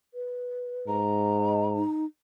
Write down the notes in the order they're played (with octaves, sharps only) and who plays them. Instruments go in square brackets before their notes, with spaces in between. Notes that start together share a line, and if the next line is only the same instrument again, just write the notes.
[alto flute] B4
[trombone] G#2 [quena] A#5
[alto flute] D#5
D#4